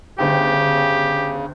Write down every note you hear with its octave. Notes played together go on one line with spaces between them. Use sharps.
G1 D2 C#3 G4 G5